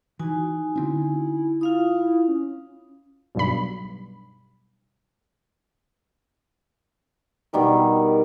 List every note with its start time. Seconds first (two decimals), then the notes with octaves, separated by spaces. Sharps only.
0.19 E3 D#4 F#4 G#5
0.76 D3 C4 C#4 E4
1.61 E4 F4 F5 D#6
2.28 C#4
3.35 B1 G2 B5
7.53 B2 D#3 G3 A#4